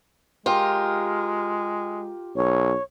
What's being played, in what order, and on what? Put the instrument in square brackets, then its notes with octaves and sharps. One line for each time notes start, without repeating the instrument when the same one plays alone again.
[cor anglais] G#3 [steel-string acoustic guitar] F4 G4 A#4
[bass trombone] B1 [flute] C#5